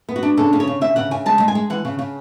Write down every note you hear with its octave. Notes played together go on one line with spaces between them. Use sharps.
B3
F#4
D4
C#3 A4
C#3
C#5
C#3
C#3 E5
C#3 F#5
C#3 G#5
G#3 A5
G#3
G#5
G#3
E3 F#5
C#3
C#3